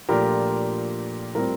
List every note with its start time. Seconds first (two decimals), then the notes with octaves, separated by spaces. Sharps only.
0.09 A#2 F3 A3 D4 F4 G4 A#4
1.35 A2 G3 C4 F4 A#4